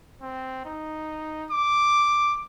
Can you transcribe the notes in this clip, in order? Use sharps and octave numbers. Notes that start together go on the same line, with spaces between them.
C4
D#4
D6